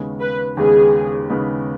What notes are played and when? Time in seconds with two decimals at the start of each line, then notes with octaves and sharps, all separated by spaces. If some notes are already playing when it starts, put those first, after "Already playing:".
Already playing: D#2 C#3 G#3 B3
0.21 B4
0.57 D#2 C#3 G#3 B3 G#4
1.30 D#2 C#3 G#3 B3